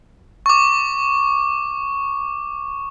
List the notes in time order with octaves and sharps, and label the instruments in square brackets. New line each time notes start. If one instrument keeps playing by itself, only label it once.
[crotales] C#6 D6